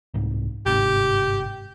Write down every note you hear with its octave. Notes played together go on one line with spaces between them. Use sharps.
C2 G#2
G1 G#2 C3 G4